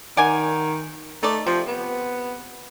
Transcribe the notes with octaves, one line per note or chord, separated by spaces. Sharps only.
D#3 D5 F#5 G#5
A3 D#4 D5
C3 F3
B3